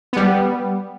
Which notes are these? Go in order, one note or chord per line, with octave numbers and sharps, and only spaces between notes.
G3 B3